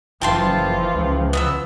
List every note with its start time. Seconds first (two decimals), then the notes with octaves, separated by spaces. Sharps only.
0.22 F#1 E3 F3 F4 G5 A5 C6
0.94 C#2
1.33 B3 A5 E6